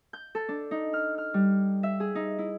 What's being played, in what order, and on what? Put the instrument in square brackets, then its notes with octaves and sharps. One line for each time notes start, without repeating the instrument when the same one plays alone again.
[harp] G6
A4
D4
D#4
F6
F6
G3
E5
G#4
D#4
E4